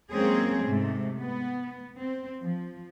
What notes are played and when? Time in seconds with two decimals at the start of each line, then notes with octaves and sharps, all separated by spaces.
0.11 F#3 G#3 A#3 C4 C#4 G#4
0.63 G#2 C3 A3
1.16 B3
1.99 C4
2.40 F3